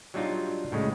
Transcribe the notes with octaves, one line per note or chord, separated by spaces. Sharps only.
F#3 G3 D4 D#4 F4
A2 C#3 G#3